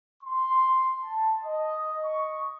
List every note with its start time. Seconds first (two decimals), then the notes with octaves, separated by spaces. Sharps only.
0.23 C6
1.03 A5
1.45 D#5
2.05 C#6